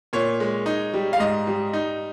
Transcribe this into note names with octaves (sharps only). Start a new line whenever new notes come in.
A#2 C#5
G#3
D#4
G3
F5
G#2 D#5
G3
D#4